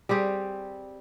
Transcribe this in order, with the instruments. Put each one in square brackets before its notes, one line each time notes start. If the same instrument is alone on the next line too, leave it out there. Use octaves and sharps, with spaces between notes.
[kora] G3 C4 G4 G#4